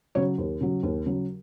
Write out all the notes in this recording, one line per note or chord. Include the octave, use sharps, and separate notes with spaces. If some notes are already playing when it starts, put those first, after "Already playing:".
C#3 F#3 C#5
D#2
C#3 F#3
D#2
C#3 F#3